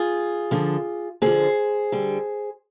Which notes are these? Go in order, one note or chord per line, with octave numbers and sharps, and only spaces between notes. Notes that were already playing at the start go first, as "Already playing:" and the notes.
Already playing: F4 G#4
D3 F3
D3 F3 G#4 C5
D3 G3